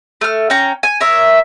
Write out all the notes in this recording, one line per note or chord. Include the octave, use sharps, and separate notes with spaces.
A3 F6
C#4 G5 A#5
G#5
A#4 C#5 E5